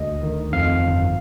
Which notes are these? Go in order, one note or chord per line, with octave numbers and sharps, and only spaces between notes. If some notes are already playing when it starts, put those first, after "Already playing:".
Already playing: D2 D#5
D#3
F2 F5
G1